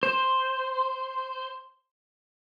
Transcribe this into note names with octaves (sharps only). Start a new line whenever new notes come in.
C5 C6